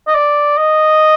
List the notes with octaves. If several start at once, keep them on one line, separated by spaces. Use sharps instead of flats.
D#5
D5
D#5